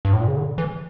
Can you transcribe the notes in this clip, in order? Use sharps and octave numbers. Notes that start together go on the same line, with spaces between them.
G2
A2
A#2
C#3
D3
E3